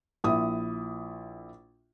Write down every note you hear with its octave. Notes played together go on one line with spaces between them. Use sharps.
A#1 E4 D#6